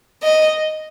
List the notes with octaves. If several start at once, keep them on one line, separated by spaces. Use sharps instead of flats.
D#5